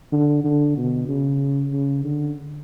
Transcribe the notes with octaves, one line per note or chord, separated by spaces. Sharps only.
D3
D3
B2
C#3
C#3
D3